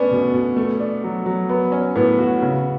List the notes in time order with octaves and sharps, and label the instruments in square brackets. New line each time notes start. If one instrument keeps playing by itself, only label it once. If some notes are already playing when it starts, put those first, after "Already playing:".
Already playing: [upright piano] A3 D4 [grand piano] B3 C#4
[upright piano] B2
B2
A3
D4
F#3
F#3
[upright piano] F#3 [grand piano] B3
[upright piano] C#4
[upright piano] A2 [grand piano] B3
[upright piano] F#4
C#3